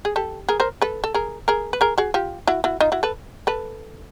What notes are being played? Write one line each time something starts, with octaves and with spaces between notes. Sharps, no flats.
G#4
G4 A4
G#4 A#4
A#4 C5
A4 B4
A4
G#4 A#4
G#4 A#4
B4
G#4 A#4
F#4 G#4
F4 G4
E4 F#4
E4 F#4
D#4 F4
E4 F#4
A4 B4
A4 B4